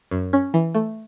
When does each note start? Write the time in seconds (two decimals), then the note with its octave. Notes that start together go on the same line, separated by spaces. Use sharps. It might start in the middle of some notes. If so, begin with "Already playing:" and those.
0.11 F#2
0.33 C#4
0.54 E3
0.75 A3